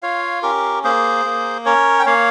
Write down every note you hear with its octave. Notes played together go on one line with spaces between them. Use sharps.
F4 C#5 F5
C#4 G4 A#4
A#3 G#4 C5
A#3
C#4 A#4 C#5
G5
A#3 C#5 F5